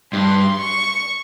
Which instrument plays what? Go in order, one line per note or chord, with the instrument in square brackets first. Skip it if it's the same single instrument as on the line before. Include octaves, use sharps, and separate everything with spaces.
[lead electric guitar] G2 [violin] C6
[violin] C#6